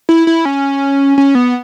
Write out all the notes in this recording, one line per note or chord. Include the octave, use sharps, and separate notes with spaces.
E4
E4
C#4
C#4
B3